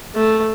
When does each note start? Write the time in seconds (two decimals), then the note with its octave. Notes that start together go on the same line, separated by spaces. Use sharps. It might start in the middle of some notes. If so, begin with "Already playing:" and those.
0.15 A3